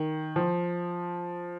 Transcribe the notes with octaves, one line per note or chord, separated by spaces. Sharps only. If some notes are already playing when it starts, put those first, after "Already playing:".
Already playing: D#3
F3